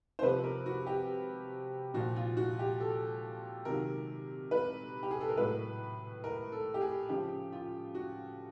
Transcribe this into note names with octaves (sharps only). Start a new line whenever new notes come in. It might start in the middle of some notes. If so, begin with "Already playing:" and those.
C5
C3 F3 B4
A#4
F#4
G4
A#2 F3 F#4
F4
F#4
G4
A4
C3 D#3 F#3 A#4
B4
G4
G#4
A4
A#4
A2 F#3 B4
A#4
A4
G4
G#4
C#3 F3 G4
F4
F#4